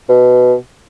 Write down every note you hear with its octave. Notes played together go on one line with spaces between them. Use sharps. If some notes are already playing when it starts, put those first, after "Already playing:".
B2